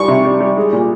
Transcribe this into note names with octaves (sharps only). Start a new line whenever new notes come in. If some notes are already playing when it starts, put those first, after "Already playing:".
Already playing: G3 C#6
C3
G3
G3
G#3
A#2